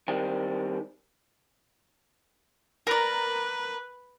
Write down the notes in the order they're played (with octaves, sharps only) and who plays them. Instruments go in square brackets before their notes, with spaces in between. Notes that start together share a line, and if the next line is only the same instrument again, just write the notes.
[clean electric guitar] D#3 G3 C4
[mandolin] A#4 D5 [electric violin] B4